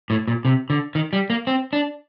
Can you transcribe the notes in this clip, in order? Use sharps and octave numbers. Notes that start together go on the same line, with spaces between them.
A2
A#2
C3
D3
D#3
G3
A#3
C4
D4